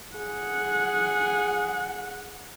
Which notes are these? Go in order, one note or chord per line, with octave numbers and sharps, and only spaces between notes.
G#4 F#5